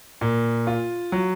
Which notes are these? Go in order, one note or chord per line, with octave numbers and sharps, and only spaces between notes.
A#2
F4
F#3